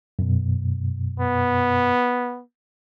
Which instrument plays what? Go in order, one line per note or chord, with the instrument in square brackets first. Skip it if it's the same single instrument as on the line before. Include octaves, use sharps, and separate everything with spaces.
[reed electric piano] F#2 B2
[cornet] B3